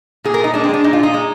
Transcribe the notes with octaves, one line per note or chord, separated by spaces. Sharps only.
A#2 G#4
A#4
A#2
D#4
G#3 D4
C4
G#3 D4
A#2 D#4
F4
A#2 D#4
G#3